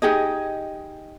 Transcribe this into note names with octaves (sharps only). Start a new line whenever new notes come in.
D#4 G4 G#4 D#5